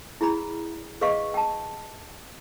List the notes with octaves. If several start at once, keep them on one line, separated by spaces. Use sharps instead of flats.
E4 G#4 A#5 B5
G#4 B4 D#5 F5 C#6
G5 A5